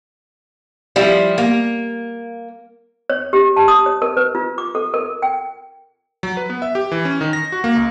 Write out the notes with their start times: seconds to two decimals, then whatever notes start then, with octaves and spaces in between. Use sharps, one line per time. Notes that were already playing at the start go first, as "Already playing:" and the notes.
0.96 F3 G3 E4
1.38 A#3
3.10 C#5
3.33 G4
3.56 A5
3.68 D#6
3.86 C#5
4.02 A#4
4.17 B4
4.35 F4
4.58 D6
4.75 A4
4.94 A#4
5.22 G5
6.23 F#3
6.37 B4
6.50 B3
6.62 E5
6.75 G4
6.92 E3
7.05 C#4
7.21 D#3
7.33 A#6
7.52 F#4
7.64 A#3
7.76 C#2